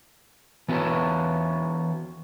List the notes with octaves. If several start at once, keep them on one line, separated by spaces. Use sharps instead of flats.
E3 B3 F#4 B4 C#5